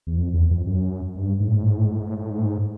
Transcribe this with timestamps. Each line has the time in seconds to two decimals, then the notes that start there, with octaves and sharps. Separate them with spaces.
0.07 E2
0.17 F2
0.33 E2
0.51 F2
0.66 F#2
1.16 G2
1.40 G#2
1.48 A2
1.55 G#2
1.62 A2
1.69 G#2
1.77 A2
1.85 G#2
1.92 A2
2.00 G#2
2.07 A2
2.15 G#2
2.22 A2
2.30 G#2
2.38 A2
2.45 G#2